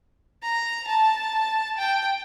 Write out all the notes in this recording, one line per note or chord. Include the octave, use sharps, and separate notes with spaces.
A#5
A5
G5